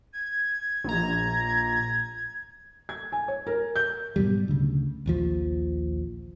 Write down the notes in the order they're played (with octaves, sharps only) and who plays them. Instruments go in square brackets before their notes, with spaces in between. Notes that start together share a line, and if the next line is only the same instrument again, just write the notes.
[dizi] G#6
[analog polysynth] A#1 A#5
[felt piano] G#6
G#5
C#5
A#4
G6
[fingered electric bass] G#2 B2 F#3 G3
D2 C#3
A#1 D#2 F3